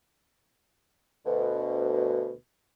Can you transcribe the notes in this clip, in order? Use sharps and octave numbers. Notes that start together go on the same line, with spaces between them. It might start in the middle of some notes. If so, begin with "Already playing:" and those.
D2 B2